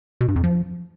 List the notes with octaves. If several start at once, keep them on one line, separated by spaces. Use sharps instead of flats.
B2
G2
F2
F3